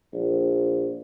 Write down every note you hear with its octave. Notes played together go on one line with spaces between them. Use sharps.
A#1